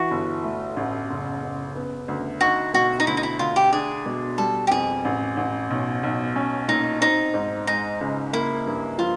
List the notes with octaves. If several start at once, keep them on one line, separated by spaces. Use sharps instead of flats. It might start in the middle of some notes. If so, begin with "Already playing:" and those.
Already playing: E3 F#4
G1
A3
A1
F#1
F#1
B3
D2
D#4 F#4
B2 F#4
D#4
D2 E4
D#4
E4
D2 F4
G4
D4 G#4
B2
G3 A4
G4
F2 G#4
A1
A1
B1
B1
C#4
A#2 D#4
C4 D#4
G#2
G#3 D#4
C#2
A#3 E4
G2
F3 F4